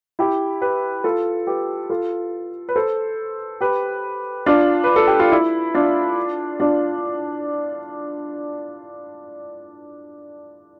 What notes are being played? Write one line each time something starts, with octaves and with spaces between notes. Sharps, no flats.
E4 G4
G4 B4
F4 A4
G4 B4
F4 A4
B4
A4 C5
G4 B4
D4 F4
B4
A4
G4
F4
E4
D4 F4
D4 F4